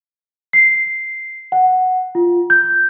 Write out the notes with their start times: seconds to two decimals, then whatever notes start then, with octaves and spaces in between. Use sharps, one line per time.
0.53 C7
1.52 F#5
2.15 F4
2.50 G6